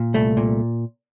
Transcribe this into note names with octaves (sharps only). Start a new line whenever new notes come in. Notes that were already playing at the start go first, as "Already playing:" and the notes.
Already playing: A#2
C2 A3
A#2